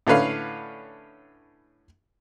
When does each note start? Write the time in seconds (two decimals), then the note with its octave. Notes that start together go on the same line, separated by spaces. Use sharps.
0.07 A2 D3 C#4 B4 F5